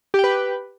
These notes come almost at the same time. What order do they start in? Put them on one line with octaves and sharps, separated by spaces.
G4 G5 B4